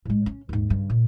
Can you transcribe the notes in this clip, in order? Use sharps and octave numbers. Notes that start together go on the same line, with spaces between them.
A2 G#3
C#4
D#2 G#2
G2 C#3
A#2